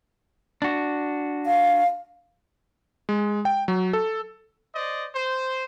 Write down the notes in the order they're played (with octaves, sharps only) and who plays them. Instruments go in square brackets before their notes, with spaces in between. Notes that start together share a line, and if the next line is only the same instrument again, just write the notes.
[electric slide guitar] D4 F#4
[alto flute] F5
[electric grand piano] G#3
G5
F#3
A4
[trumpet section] C5 D5 D#5
C5